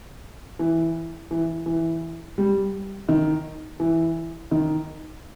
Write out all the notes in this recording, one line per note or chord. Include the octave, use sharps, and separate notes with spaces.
E3
E3
E3
G3
D#3
E3
D#3